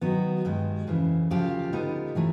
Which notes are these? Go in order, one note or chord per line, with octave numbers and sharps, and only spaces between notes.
D#3 F#3 B3 F#4
G2 D#3 G#3
F2 C#3 E3
D2 C#3 F3 F4 G4
D3 G3 B3 D#4
C3 E3 A3